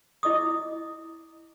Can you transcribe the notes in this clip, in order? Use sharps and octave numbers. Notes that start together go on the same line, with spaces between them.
E4 D#5 D6 D#6